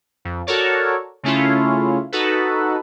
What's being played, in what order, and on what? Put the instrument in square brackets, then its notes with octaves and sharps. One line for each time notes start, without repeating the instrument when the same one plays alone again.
[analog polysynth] F2
F#4 A4 A#4 C#5 D5
C#3 A3 C#4 E4 F4
D#4 F#4 A4 B4